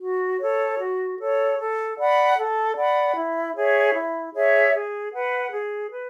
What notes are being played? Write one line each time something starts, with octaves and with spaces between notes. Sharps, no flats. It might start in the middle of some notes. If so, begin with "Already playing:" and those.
F#4
A4 C#5
F#4
A4 C#5
A4
D5 F#5 B5
A4
D5 F#5 B5
E4
G#4 C#5 E5
E4
G#4 C#5 E5
G#4
B4 F#5
G#4
B4